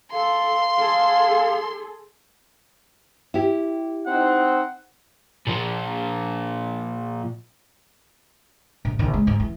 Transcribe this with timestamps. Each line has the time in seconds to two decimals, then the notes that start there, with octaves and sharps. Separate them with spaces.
0.13 A4 F5 C6
0.78 G#4 A4
3.34 E4 G4
4.07 C4 D#4 F#5
5.47 A#2 F3
8.85 A#1
8.99 A#1 D#3
9.14 G#3
9.27 G#2
9.40 E3